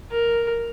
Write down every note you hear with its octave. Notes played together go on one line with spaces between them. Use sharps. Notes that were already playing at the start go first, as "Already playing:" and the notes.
A#4